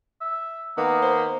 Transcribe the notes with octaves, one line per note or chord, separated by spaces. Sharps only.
E5
D#3 A#3 B3
C5